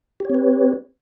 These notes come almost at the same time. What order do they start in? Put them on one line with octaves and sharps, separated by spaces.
G4 C#5 C4 B4